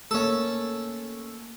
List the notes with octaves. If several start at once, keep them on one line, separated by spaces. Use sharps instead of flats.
A3 A#3 C#4 A4